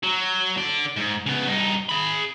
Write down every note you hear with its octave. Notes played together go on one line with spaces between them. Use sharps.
F#3
D3 D5
G#2
C#3 B3
G2 D#4
G#4 B5